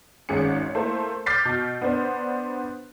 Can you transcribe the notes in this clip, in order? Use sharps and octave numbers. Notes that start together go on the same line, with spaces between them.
G#1 G#2 G#3 C#4 C#7
A3 A#3 E4 C5
D6 F6 G6 A6 B6 C7
B2
B3 D4 B4 C5